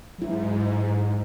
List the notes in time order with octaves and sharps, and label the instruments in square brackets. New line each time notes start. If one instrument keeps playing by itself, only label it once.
[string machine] G#2 [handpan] F#3 E4